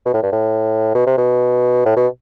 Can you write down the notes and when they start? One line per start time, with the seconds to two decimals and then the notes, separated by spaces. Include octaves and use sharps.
0.06 B2
0.14 A2
0.23 G2
0.32 A2
0.95 B2
1.07 C3
1.18 B2
1.86 A2
1.96 B2